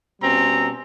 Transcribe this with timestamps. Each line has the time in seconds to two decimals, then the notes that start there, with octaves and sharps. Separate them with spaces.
0.22 B2 G3 C4 C#4 A#5